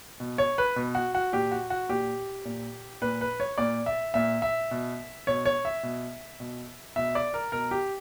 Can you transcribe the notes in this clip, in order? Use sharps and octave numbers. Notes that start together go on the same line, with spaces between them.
B2
C#5
B4
B2
F#4
F#4
A#2 G4
F#4
F#4
A#2 G4
A#2
A#2 B4
B4
C#5
A#2 D5
E5
A#2 E5
E5
B2
B2 C#5
C#5
E5
B2
B2
B2 E5
D5
A#4
B2 A#4
G4